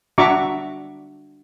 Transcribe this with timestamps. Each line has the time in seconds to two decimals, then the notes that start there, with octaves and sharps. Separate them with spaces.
0.18 D4 F#4 E5 A#5 C#6 D6